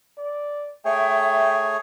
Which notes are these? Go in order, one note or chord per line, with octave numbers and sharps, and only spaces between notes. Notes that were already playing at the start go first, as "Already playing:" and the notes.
D5
A3 G#4 C#5 E5 G5